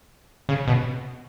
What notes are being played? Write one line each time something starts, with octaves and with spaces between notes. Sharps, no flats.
C#3
B2